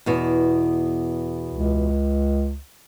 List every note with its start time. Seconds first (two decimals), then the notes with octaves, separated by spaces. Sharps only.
0.06 E2 B2
1.51 C#2